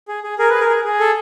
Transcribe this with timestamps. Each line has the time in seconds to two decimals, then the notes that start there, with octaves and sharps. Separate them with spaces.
0.08 G#4
0.24 G#4
0.38 G#4 A#4
0.50 G#4 B4
0.61 A#4
0.69 G#4
0.85 G#4
1.00 A4